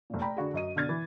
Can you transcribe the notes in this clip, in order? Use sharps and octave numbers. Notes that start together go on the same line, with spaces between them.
F1 A#2
D5 G5 A#5 B5
D3 F#4 G#4
F#2 D#5 D#7
B2 D3 F6 G#6 A6
E3